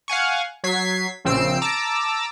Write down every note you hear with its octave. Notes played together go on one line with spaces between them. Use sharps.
F5 F#5 G#5 C#6
F#3 G#6 B6 C7
A#1 C#3 C4 E6 C7 D7
A5 A#5 D6 E6